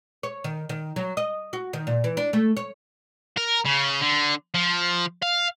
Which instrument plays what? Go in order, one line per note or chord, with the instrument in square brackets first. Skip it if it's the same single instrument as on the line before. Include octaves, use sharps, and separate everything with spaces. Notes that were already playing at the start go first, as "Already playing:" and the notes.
[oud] C#5
D#3
D#3
F#3
D#5
F#4
D#3
A#2
E3
D4
A3
C#5
[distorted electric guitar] A#4
C#3
D3
F3
F5